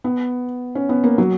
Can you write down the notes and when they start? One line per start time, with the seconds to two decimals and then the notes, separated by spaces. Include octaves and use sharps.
0.04 B3
0.75 C#4
0.89 B3
1.04 A#3
1.18 F#3